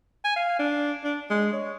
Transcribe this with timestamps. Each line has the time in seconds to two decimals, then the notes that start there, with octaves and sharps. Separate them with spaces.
0.24 G#5
0.36 F5
0.59 D4
1.04 D4
1.30 G#3
1.53 C#5